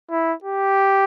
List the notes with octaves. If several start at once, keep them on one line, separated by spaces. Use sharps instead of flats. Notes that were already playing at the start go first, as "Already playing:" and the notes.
E4
G4